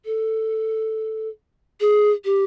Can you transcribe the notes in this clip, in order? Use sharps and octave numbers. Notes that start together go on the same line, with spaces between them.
A4
G#4
G4